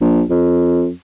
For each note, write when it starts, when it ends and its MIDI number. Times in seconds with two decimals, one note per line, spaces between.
0.01 0.22 34
0.30 0.89 41